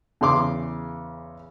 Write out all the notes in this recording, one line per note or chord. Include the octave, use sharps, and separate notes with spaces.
E2 C#3 C6 D6